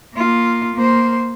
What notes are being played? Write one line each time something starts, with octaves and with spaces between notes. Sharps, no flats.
A#3 F4
A#3 C5